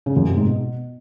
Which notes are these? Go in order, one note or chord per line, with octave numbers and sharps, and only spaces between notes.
C#3
F#2
C3
G#2
B2